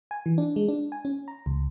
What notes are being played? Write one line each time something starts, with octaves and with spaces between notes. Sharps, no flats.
G#5
E3
D4
G#3
D4
G#5
C#4
A#5
C#2